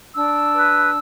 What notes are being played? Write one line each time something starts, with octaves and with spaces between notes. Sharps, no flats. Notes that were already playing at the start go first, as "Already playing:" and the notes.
D4 E6
B4